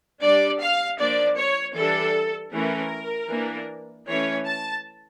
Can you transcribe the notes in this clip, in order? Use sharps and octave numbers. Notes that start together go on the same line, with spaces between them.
G3 D4 D5
F5
F3 A#3 D4 D5
C#5
E3 G3 D4 A4
E3 A3 C#4 A#4
E3 A#3 D4
E3 A3 C#4 C#5
A5